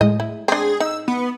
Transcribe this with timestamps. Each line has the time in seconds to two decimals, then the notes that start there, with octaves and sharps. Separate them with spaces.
0.01 A2 G#3 D#5
0.20 E4
0.48 C4 D4 G#4
0.80 D#4 E6
1.08 B3